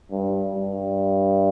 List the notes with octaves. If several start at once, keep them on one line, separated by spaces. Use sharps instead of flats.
G2
G2